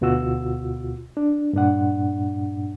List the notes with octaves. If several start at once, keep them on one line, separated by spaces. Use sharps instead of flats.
D2 B2 F4 F#4 E6
D4
G2 A#2 D4 F#5